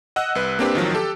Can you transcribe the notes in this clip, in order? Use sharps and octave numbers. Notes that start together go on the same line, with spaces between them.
D#5 F#5 E6 F#6
C2 B4
A#3 C4 D4 G4 B4
A1 D#3 F3 F#3
G4 A4